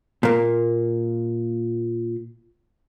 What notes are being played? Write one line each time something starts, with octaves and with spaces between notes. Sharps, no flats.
A#2 A#3